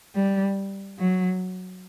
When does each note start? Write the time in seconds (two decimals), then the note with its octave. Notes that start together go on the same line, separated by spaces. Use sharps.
0.16 G3
0.99 F#3